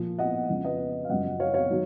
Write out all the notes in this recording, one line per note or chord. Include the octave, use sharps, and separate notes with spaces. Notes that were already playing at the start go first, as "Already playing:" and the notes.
Already playing: A#2 F3
D#5 F#5
F2 C#3 F3
B4 D#5
F5
F#2 C#3 F3 D#5 F#5
C#5 F5
C#5 F5
D#3 F#3